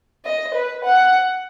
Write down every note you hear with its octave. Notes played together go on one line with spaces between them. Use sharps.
D#5
B4
F#5